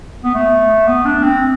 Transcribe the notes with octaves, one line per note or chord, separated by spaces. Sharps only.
B3
A3
B3
D4
C4